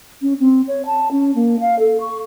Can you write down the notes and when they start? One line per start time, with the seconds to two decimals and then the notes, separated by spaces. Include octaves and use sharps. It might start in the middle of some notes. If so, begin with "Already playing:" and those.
0.22 C#4
0.39 C4
0.67 C#5
0.86 A5
1.11 C#4
1.35 A#3
1.60 F5
1.79 A4
2.00 C#6